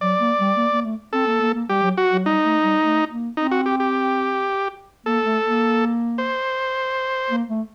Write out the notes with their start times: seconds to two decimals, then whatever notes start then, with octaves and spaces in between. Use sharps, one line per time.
0.01 F#3 D5
0.19 A#3
0.39 G3
0.57 A#3
0.72 A#3
0.85 A3
1.13 C4 A4
1.27 A#3
1.41 A#3
1.55 A#3
1.69 G3 G4
1.83 F#3
1.98 F#4
2.12 F#3
2.25 G3 D#4
2.44 A3
2.63 G3
2.82 A3
3.10 A#3
3.37 C4 D#4
3.51 F#4
3.66 G4
3.80 G4
5.06 A#3 A4
5.25 A3
5.44 A#3
6.18 C5
7.30 A#3
7.49 A3